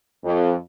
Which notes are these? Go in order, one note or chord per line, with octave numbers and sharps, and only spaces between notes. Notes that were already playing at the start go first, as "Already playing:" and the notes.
F2